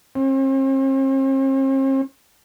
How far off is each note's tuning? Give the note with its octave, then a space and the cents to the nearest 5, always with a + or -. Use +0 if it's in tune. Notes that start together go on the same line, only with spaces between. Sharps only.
C4 +45